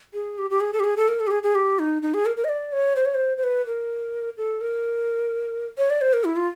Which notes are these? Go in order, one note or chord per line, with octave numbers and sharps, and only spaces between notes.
G#4
G4
G4
G#4
A4
G4
G#4
A4
A#4
A4
G4
G#4
G#4
G4
D#4
D#4
G#4
A#4
A#4
D#5
D5
C#5
C5
C#5
C5
C5
B4
A#4
A4
A#4
C#5
D5
C5
A#4
E4
F4